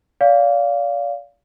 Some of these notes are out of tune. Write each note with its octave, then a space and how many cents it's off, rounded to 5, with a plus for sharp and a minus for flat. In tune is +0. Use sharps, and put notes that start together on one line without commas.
D5 -35 F5 +0